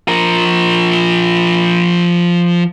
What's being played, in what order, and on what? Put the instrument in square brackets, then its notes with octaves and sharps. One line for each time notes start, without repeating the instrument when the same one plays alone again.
[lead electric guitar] F3 A#4